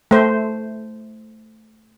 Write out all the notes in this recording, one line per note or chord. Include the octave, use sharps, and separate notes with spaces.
A3 C5